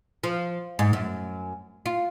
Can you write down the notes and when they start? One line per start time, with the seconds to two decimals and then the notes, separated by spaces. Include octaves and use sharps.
0.24 F3
0.79 G#2
0.93 F#2
1.86 F4